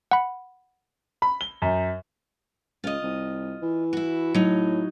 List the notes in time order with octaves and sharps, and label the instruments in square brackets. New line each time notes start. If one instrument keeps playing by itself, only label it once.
[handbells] F#5 B5
[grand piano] B5
G7
F#2
[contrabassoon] C#2 [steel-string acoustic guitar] F4 D#5
[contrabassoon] C2
E3
[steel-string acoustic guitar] E4 F#4
[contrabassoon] A2 [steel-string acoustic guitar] F#3 D#4